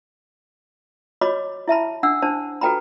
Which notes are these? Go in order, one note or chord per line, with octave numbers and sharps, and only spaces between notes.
F#4 C#5 D#5 B5 D6
E4 E5 A5 B5
D4 F#5 E6
D4 C5 A5
F#4 A4 B4 G5 A#5 B5